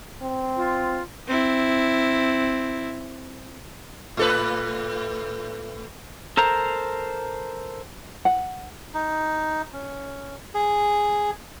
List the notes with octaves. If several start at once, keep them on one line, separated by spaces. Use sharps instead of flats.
C4
F4
C4 E4
A2 A4 B4
A4 A#4 C5 A#5
F#5
D#4
C#4
G#4